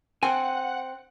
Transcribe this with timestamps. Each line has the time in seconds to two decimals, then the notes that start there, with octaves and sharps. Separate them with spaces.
0.23 C4 F#5 G#5